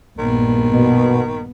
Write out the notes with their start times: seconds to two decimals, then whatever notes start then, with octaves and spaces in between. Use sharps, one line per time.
0.19 A#1 G2 D#3 B3
0.71 B2